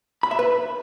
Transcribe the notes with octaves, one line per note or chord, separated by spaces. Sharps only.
B5
E5
B4